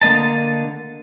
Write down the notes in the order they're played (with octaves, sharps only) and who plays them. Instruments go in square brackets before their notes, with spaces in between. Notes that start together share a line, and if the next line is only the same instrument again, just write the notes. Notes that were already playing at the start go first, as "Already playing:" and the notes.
[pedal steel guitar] D3 A#3 D#5 A5